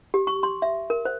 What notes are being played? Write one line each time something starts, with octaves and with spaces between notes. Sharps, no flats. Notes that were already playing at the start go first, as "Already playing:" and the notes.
G4
C#6
C6
E5
A#4
C5